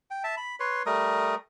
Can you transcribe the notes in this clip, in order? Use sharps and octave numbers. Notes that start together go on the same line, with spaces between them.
G5
E5 A5
B5
B4 C#5 C6
G3 A3 A#4 D#6